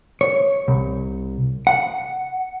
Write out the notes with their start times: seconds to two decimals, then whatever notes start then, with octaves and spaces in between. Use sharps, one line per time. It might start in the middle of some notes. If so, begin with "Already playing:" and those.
0.21 C#5
0.68 C2
1.67 F#5